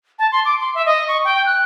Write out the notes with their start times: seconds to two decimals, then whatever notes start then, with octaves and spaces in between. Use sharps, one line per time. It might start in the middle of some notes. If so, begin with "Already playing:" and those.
0.19 A5
0.32 C6
0.45 D6
0.60 C6
0.75 E5
0.86 D#5
1.08 C#6
1.25 G5
1.46 F#6